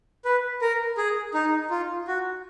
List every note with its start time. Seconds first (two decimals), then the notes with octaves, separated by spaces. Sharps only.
0.25 B4
0.62 A#4
0.97 G#4
1.34 D#4
1.70 F4
2.08 F#4